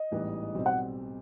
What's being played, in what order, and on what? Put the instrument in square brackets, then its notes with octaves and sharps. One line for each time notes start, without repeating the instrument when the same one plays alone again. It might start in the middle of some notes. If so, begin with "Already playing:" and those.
Already playing: [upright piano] D#5
[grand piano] A1 G#2 E3 G3 B3
B1 B2 G3 C4
[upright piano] F#5